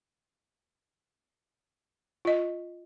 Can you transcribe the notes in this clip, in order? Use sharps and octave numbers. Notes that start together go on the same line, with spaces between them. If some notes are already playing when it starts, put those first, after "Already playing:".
F4 D#5